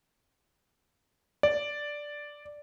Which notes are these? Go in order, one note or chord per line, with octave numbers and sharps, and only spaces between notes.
D5